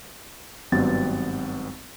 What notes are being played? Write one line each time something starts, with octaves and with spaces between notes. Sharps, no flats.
G#1 G2 F#3 B3 C4 A6